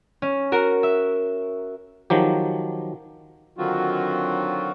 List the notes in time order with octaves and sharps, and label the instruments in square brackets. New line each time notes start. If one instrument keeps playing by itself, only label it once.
[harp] C#4
F#4 A#4
E5
[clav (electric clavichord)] D#3 F3 F#3 G4
[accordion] D3 D#3 F#3 C4 F4 F#4